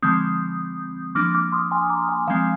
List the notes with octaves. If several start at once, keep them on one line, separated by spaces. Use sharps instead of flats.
D3 F3 G#3 C4 D#6 G6
F3 A#3 D4 D6 F6
D6 F6
C6 D#6
G#5 C6
A#5 D6
G#5 C6
F3 G#3 C4 F5 G#5